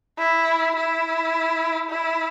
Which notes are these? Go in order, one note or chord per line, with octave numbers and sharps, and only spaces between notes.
E4
E4
E4